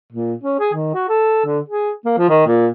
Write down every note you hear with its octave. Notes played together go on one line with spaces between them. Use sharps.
A#2
C#4
G#4
D#3
F#4
A4
D3
G#4
A#3
F3
D#3
A#2